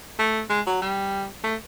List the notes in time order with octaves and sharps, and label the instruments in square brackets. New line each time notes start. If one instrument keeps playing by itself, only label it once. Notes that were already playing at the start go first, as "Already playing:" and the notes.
[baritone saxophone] A3
G#3
F#3
G3
A3